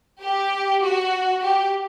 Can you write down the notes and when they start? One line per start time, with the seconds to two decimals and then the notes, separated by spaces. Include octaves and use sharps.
0.22 G4
0.83 F#4
1.43 G4